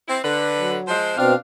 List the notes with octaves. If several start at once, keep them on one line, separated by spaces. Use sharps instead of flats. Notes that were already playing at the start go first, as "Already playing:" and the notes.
C4 E4
D3 B4
F#3
F3 G#3 C5
B2 C4 D4 F5